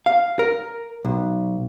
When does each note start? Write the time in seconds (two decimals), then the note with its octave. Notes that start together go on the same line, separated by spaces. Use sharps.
0.06 F5
0.39 A#4
1.05 B1